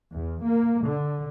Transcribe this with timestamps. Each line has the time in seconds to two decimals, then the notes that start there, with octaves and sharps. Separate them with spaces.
0.13 E2
0.45 A#3
0.86 D3